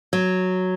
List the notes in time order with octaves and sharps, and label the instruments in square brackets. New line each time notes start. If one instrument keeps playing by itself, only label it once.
[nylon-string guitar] F#3